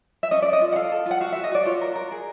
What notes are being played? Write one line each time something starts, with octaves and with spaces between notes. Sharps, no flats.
E5
C#4 D#5
C#4 D5
D#5
F4
F#5
A4 F5
A4
F4 F#5
F#4 F5
F#4 E5
D#5
F#4 D5
F4 C#5
A#4
A#4
G#4